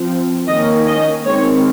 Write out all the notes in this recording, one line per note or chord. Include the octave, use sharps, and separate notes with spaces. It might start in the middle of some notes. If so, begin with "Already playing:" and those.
Already playing: F3 C4
D#3 A#3 C#4 D#5
D#5
D#3 G#3 C4 C#5